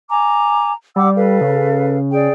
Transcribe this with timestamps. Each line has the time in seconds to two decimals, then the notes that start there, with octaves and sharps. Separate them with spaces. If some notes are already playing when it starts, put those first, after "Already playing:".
0.09 G#5 A#5 D6
0.96 G3 F#5 D6 E6
1.16 A4 B4 F5
1.41 C#3
2.11 G#4 D5 G5